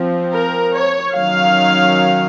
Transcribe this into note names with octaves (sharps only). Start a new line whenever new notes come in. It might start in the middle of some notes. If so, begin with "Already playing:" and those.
Already playing: F3 C4
A#4
C#5
D#3 F#3 C#4 F5